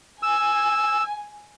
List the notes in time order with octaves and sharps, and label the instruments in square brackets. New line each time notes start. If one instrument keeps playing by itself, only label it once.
[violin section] G#5 [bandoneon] E6